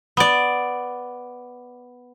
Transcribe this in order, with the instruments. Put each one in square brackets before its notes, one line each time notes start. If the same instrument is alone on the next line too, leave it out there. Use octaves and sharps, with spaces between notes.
[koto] B3 D5